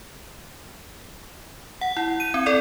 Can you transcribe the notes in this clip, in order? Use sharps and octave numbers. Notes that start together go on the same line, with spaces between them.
F#5
E4
D#7
C4
A4 D5